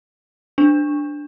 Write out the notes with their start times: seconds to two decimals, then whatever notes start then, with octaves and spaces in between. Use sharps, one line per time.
0.58 D4